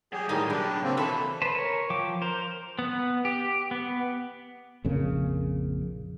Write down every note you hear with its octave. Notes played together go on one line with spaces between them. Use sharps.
F#3 G4 G#4
A2 D#3 G3 D#4 G#4 A4
B2 D4
C#3 A#3 C4
E3 F#4 A4 A5 B5
B4 C5 A5
A#4 C#5
F3 G5 D6
A#4 C5
B3
G4
B3
A#1 F2 C#3 A#3